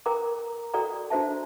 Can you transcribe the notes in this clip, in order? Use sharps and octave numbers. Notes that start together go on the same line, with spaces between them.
A#4 G5 A#5 D6
F#4 A4 D5 G5 A#5
D4 F#4 C5 E5 A5